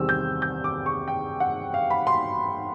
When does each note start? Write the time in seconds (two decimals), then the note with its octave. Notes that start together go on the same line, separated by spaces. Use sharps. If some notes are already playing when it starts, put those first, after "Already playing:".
Already playing: E2 C3 D#3 G3 C4 E6
0.09 G6
0.42 G6
0.64 D6
0.86 C#6
1.08 G5
1.40 F#5
1.74 F5
1.90 B5
2.07 C6